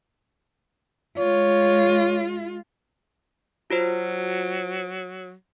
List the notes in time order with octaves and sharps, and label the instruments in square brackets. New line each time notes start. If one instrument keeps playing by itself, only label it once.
[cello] G#3 F4 [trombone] C#5
[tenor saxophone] F#3 [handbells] F4 F#4 C5